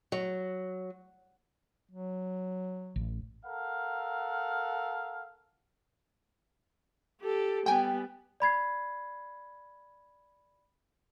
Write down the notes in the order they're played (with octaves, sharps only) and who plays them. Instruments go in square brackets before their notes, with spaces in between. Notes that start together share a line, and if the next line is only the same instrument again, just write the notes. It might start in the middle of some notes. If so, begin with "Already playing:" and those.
[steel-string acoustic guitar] F#3
[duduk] F#3
[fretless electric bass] A1
[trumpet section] A4 A#4 F5 F#5
[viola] G4 A4
[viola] G3 B3 [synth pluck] G5 G#5
[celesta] D5 B5 G#6 C7